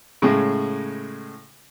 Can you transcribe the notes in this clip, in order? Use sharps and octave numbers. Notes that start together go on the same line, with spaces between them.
A2 C#3 G#3